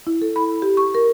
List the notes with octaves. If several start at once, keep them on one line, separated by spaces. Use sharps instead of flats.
E4
A4
B5
G4
C#6
A#4